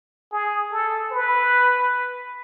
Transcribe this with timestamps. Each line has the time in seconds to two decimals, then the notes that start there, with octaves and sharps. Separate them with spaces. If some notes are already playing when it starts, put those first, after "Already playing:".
0.32 G#4
0.72 A4
1.11 B4